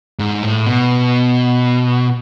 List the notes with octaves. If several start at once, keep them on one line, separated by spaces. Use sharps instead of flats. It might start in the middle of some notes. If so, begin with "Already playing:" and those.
G#2
A2
B2